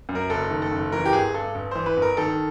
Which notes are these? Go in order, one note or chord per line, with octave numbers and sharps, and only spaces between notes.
F#2
A#4
F#1 A4
D#3
A4
F#1
E3 A#4
G4
G1 G#4
G2 A4
G1
E3 C5
B4
G1
A#4
D#3 A4